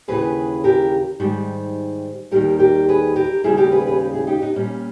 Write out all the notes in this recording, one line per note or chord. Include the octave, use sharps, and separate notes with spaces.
D#2 C#3 E3 G#4 B4
G4 A#4
G#2 D#3 G3
D#2 D#3 G3 G4 A#4
G4 A#4
G#4 B4
G4 A#4
D#2 C#3 G3 E4 G#4
G4 A#4
G#4 B4
G#4 B4
G4 A#4
E4 G#4
D#4 G4
B3 D#4
A#2 G3 A#3 C#4